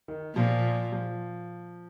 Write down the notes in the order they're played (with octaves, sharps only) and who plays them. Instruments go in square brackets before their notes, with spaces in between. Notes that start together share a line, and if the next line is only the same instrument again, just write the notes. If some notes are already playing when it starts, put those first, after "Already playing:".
[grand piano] D#3
[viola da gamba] A#2 [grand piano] F3
[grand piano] F3